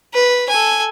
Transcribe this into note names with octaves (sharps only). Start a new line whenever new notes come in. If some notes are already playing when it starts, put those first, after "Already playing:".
B4
A4 G#5